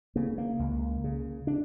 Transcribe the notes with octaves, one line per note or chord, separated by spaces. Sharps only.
C#3 A#3
A#3
C#2
C#3
D4